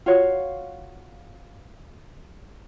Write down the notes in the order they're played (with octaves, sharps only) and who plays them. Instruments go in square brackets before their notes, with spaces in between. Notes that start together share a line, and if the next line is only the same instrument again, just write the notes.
[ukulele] F4 F#4 C#5 F5